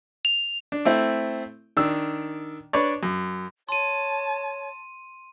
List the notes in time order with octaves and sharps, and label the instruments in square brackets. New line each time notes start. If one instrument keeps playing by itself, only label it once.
[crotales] F7
[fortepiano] D4
A3 C4 E4
D#3 D4 E6
D4 B4 C#5 D5
F#2
[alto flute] C#5 [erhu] A5 [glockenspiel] C6 D#7